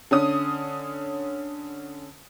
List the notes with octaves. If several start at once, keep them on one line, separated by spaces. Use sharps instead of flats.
D3 C#4 D#6